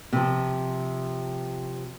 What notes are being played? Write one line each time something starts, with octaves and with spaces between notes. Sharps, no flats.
C3 F3